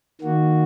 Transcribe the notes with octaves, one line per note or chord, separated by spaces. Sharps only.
D#3 A#3 F#4